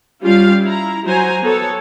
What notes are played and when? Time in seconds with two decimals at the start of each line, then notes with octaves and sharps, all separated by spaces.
0.22 G3 C#4 F4 G4 F5
0.63 E4 A#5
1.06 F#3 C5 G#5 A#5
1.43 B3 A4 C#5